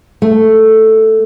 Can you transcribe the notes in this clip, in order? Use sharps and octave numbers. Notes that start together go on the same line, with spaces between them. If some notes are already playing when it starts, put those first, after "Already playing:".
A3